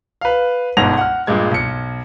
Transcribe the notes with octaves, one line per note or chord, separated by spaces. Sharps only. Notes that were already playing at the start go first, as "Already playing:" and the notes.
B4 F5
G1 G#2 B2 F#5 A#6 F7
F#5 F6
G2 A#2 G#3 G#6
B1 C#7